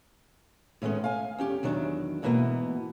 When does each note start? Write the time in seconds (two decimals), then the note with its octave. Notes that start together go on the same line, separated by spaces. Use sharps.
0.82 A2 D#3 G#3 B3 C#4
1.04 F5 G#5
1.38 E2 C#4 G4
1.63 E2 D#3 F#3 D4
2.22 E2 G#2 B2 E3 A#3 B3